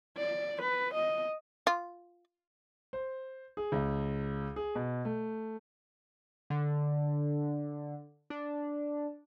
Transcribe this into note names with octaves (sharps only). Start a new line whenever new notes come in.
D5
B4
D#5
F4
C5
G#4
C#2
G#4
B2
A3
D3
D4